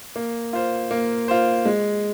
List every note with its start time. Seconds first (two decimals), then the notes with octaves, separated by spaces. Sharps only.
0.16 A#3
0.53 F4 C5
0.91 A#3
1.28 F4 C5
1.66 G#3